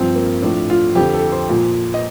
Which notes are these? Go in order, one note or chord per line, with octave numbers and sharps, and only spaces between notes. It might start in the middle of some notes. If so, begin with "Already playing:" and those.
Already playing: G2 F3 C4
A#3
A2 F3 D4
F4
F2 D3 F3 G4
A4
C5
A#2 F3
D#5